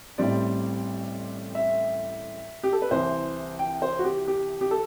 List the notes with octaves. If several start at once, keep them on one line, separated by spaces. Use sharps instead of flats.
A1 A2 G3 C4 D5
E5
G4
A4
B4
C2 C3 E3 C5
G5
C5
F#4
G4
G4
G4
A4